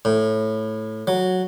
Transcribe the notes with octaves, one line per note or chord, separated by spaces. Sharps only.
A2
F#3